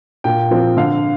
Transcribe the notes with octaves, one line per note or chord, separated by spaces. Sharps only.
A#2 G5
F3 C4
D3 F5